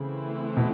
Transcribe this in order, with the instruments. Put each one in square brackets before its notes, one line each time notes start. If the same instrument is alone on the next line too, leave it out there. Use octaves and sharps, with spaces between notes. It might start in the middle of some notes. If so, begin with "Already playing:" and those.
Already playing: [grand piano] C#3 [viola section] E3 A3 C4 E4
[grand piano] B2